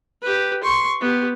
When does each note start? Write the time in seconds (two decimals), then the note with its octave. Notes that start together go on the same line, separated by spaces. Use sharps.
0.22 G4 B4
0.63 C6 C#6
1.01 B3 G4